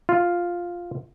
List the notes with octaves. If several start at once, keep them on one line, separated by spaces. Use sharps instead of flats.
F4